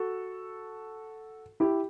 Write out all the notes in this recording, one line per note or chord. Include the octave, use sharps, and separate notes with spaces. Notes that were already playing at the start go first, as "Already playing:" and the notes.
Already playing: F#4 A4
E4 G4